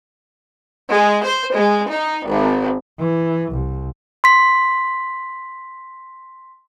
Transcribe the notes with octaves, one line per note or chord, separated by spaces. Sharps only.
G#3
C5
G#3
D#4
G#1
E3
C2
C6 B6